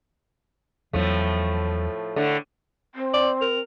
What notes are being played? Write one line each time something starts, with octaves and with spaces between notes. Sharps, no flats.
E2 A2 F3 F#3 A3
A2 D3 A3
C4
D5
A#4